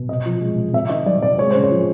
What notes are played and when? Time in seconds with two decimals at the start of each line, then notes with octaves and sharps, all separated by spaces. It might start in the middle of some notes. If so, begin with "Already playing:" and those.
Already playing: B2
0.09 C3 D#5
0.26 F3
0.41 G#3
0.57 C3
0.73 C3 E5
0.89 D#3 D#5
1.06 G3 D5
1.22 C3 D5
1.38 G#3 C#5
1.51 C#3 C5
1.64 C#5
1.71 F3